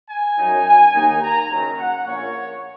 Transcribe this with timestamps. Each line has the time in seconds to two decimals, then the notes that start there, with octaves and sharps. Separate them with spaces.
0.09 G#5
0.37 F#2 F#3 D#4
0.65 G#5
0.94 D#2 D#3 A#3 D#4 G#5
1.22 A#5
1.49 F#1 F#2 D#3 F#3
1.78 F#5
2.05 A#1 A#2 A#3 C#4 C#5